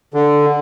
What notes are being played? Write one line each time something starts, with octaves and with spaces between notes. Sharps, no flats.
D3